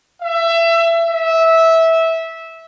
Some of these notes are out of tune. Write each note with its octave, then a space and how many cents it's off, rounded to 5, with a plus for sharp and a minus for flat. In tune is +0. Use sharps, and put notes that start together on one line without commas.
E5 +25
E5 -15